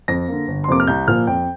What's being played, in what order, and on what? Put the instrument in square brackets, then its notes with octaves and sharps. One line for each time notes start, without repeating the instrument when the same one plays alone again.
[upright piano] F2 A#6
D3 A#3
G1
C6
F2 C3 A#3 D6
F6
C2 G6
A#2 F3 A#3 F6
F2 G5